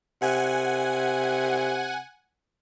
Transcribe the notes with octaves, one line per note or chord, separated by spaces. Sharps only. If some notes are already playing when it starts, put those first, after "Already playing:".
C3 F#5 G#5